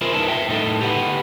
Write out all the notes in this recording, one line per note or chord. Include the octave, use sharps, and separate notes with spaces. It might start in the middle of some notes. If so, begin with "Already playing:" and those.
E4 F4 G#4 A#4 C5
D#4 A#4 B4 A5
E5 G5
A2 D#4 A4
G4 B4 F#5